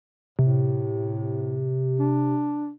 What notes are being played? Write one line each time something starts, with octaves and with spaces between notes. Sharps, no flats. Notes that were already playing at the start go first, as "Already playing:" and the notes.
A2 C3
D4